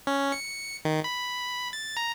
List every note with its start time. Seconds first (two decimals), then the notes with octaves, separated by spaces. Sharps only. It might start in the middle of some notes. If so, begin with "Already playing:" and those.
0.07 C#4
0.32 C#7
0.85 D#3
1.04 B5
1.73 A6
1.97 A#5